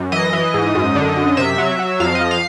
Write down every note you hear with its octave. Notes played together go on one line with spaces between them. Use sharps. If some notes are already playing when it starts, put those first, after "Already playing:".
Already playing: F#2
E3 D#5
E3
G#2
F#2
D3
F#2
C3 E5
F#3
F#3
F2 F5
D#5
F3
F5